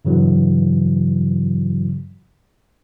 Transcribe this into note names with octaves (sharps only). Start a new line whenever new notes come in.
G2 C#3 E3 F#3